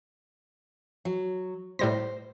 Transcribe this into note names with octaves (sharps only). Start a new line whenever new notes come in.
F#3
A2 G3 C5 A#6